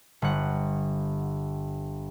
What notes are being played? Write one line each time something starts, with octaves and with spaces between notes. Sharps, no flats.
G1 F#5